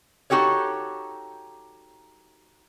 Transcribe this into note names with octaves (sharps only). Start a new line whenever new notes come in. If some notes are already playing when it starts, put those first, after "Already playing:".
D#4 F#4 G4 A4 C#5